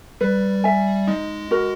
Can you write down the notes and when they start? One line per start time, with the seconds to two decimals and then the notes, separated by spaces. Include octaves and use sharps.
0.21 G3 B4
0.64 E5 G#5
1.07 G#3 D#4
1.51 F#4 A#4